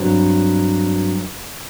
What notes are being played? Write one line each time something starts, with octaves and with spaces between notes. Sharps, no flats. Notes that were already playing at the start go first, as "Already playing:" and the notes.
Already playing: G2 F#3 C4